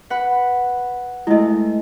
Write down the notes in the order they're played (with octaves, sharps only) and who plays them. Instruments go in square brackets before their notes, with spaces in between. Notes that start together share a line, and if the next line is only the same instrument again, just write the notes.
[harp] B4 F#5
[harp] G#3 A3 [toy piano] E4 D#5